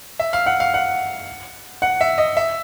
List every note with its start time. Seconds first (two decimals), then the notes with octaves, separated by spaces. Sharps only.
0.19 E5
0.33 F5
0.46 F#5
0.60 F5
0.74 F#5
1.82 F#5
2.01 E5
2.18 D#5
2.37 E5